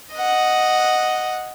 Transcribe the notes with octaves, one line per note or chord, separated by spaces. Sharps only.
D#5 F#5